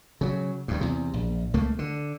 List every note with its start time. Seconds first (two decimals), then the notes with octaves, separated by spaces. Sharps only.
0.21 C#3 F#3
0.68 D2 G2
0.81 E2 C3
1.14 A#1
1.54 C#2 A3 A#3
1.79 D3